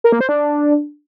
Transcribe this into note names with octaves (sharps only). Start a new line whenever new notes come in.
A#4
A#3
C5
D4